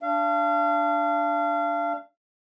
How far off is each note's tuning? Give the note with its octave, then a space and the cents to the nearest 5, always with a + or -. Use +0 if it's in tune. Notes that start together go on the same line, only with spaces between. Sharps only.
D4 +0 F5 -30